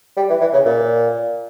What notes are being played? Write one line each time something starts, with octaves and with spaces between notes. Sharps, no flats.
G3
E3
E3
C#3
A#2